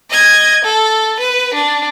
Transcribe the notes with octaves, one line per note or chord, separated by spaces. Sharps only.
D#5 G#6
A4
B4
D4